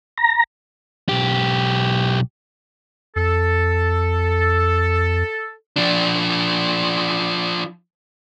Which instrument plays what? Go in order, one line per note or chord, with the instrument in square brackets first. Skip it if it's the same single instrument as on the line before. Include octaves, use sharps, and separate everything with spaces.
[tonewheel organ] A#5
[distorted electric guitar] B1 G4
[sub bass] F2 [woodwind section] A4
[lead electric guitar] F3 D4